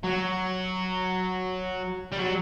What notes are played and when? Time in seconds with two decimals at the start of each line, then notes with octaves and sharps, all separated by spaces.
0.03 F#3
2.12 G3
2.18 F#3